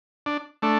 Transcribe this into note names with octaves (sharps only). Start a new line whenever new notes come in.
D4
A3 D4